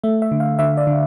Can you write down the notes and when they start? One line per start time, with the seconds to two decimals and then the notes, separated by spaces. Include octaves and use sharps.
0.03 A3 E5
0.22 E5
0.31 D3
0.40 F5
0.59 D3 E5
0.77 D5
0.87 D3